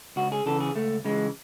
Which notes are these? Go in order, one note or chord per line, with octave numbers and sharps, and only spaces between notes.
C#2 F#4
G#4
C#3 E3 A4
G#4
C#2 A3
C#3 E3 G#3